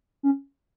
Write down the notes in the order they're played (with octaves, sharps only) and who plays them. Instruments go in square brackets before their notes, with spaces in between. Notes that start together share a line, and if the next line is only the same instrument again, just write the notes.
[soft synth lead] C#4